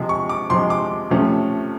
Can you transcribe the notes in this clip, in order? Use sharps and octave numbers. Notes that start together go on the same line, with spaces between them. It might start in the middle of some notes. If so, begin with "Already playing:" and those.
Already playing: C3 F3 G#3
C#6
D6
C3 F3 G#3 C6
D6
C3 F3 A3 C#4